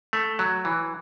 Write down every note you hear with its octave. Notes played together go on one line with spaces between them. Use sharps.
A3
F#3
E3